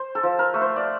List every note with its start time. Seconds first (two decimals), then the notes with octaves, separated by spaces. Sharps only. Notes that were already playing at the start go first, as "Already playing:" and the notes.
Already playing: C5
0.15 A4
0.23 F3
0.39 A#4
0.54 A3
0.62 C5
0.76 D5